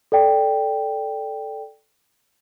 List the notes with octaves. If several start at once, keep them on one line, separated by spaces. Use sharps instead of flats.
A4 D5 G5